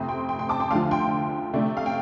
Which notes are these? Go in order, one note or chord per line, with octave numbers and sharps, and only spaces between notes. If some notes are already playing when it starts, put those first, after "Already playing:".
Already playing: F2 C3 A3 C4
G5 C6
G5 C6
G5 C6
A5 D6
G5 C6
D2 D3 F3 F5 A5
G5 C6
C3 A3 D4
F5
G5